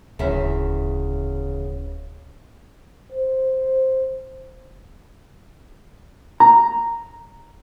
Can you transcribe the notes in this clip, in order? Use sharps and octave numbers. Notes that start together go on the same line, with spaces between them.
D1 E2 C#3 E5
C5
A#5